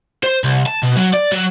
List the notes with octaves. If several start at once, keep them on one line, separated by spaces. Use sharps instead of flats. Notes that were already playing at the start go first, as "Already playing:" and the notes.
C5
C2
A5
B2
F#3
D5
F#3